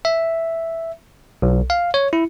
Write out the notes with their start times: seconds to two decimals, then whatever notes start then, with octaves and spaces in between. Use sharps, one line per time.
0.05 E5
1.42 B1
1.70 F5
1.94 C#5
2.13 E4